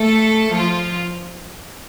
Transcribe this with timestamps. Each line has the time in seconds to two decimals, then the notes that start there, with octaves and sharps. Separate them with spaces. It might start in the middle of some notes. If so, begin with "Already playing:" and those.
Already playing: A3 A4
0.52 F3 F4